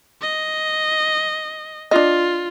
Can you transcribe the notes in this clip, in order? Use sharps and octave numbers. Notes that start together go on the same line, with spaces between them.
D#5
D4 F4 D#5